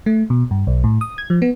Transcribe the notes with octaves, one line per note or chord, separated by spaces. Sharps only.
A3
B2
G2
B1
A2
D#6
G#6
F3
B3